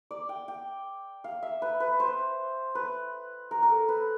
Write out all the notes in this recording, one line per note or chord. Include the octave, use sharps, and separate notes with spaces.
D5
G5
G5
F5
E5
B4
B4
C5
B4
A#4
A#4
A4
B4